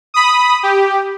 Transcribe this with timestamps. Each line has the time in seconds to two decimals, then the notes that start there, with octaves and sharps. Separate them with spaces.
0.14 B5 D#6
0.63 G4